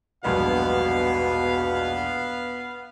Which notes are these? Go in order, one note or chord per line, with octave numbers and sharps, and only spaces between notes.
E1 A#1 G2 B2 B3 F5